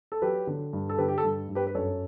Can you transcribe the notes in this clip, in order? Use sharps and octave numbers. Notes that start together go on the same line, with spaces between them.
A4
F#3 G4 B4
D3
G2
A4
D3 G4 B4
G4
A4
G2
G2
G4 B4
B4
F#2 A4 C#5